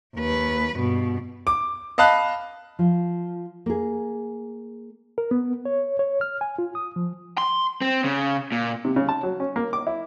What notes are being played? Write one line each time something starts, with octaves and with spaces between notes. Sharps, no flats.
D#2 B4
G2 B2
D6
D#5 F5 A5 B5 F#6
F3
A#3 G#4
A#4
B3
C#5
C#5
F6
G#5
F4
D#6
F3
C6
C4
C#3
A#2
C3
C#3
A5
F#3
C#4
A#3
D6
E4